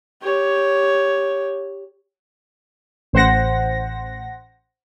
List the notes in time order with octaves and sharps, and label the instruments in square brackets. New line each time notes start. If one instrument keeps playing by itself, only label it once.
[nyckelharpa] G4 C#5
[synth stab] A1 C5 F#5 A#6